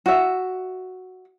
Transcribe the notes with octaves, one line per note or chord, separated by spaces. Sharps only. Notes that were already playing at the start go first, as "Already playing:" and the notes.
F#4 E5